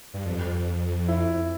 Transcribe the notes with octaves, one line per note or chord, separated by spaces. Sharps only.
G2
F2
E4